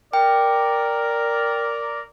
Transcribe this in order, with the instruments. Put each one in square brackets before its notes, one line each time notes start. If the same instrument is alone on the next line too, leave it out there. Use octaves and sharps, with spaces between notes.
[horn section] A#4 D5 [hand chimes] G5